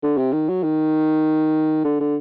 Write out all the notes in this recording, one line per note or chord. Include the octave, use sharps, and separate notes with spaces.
D3
C3
D#3
F#3
D#3
D3
D3